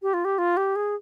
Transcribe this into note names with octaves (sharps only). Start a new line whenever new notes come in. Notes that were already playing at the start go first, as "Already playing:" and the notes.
G4
F4
G4
F4
G4
G#4